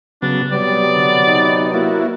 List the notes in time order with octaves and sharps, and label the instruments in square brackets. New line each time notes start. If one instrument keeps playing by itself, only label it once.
[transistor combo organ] C#3 F#3 B3 [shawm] D4
[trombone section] C3 F#3 B3 [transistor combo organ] G3 [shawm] D5
[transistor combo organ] D3
D#4
A#3 E4 F#4